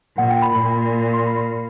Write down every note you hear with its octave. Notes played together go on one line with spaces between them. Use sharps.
A#2 F#5
G5
B5
A#2 B5
C6
B5